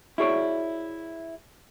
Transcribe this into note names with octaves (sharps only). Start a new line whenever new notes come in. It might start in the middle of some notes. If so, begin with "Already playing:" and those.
E4 F#4 G#4 C#5 D5